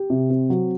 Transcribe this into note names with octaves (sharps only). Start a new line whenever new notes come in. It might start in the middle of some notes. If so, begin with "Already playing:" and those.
Already playing: G4
C3
C4
F#3